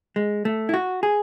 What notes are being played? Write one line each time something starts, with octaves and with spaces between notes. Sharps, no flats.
G#3
A3
E4
F#4
G#4